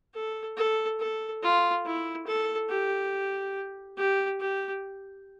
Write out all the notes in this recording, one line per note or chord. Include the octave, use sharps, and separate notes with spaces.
A4
A4
A4
F4
E4
A4
G4
G4
G4